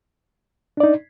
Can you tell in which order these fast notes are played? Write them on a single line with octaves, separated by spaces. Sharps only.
D4 D5 D#4